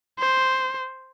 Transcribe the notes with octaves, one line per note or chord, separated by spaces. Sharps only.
C5